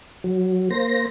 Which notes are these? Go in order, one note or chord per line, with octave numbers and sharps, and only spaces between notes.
F#3
A#3 C5 A#6